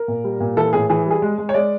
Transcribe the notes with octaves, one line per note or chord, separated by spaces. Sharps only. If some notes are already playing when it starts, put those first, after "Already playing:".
Already playing: A#4
A#2
G3
A#2
E3 A4
A2 G#4
E3 G#4
G3 G#4
G#3
G#3
C#5
G#3 D5